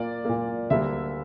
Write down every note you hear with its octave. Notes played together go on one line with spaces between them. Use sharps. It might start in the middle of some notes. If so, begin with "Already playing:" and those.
Already playing: A#2 A#3 D5
A#2 A#3
D2 D3 G3 A#3 E5